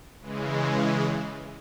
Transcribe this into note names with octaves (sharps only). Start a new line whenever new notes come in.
C#3 E3 G#3